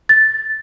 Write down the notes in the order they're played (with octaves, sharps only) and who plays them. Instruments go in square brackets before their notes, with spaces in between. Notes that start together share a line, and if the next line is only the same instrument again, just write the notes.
[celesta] A6